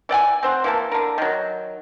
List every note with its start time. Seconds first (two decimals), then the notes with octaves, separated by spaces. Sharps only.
0.09 E3 D5 F#5 G#5
0.43 C4 C5 F#5
0.64 E3 A#3 A5
0.92 D3 A#4
1.18 D#3 F#3